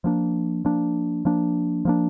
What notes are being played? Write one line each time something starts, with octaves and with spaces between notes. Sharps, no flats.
F3 A#3 D4
F3 A#3 D4
F3 A#3 D4
F3 A#3 D4